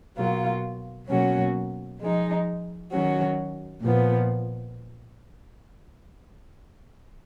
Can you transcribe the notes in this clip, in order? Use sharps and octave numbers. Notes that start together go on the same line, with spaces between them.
B2 F#3 A#3 F4
B2 F#3 A#3 C#4 F#4
F3 G#3 D#4
D#3 F#3 C#4 F#4
A#2 F3 B3